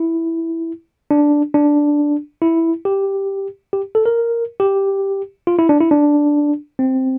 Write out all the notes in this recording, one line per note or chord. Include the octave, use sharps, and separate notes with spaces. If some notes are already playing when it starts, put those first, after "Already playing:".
Already playing: E4
D4
D4
E4
G4
G4
A4
A#4
G4
F4
E4
D4
E4
D4
C4